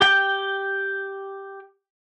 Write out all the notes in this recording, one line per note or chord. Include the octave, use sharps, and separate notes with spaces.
G4 G5